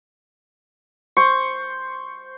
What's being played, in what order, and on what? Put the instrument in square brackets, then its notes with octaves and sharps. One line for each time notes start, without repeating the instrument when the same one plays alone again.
[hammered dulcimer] C5 C#6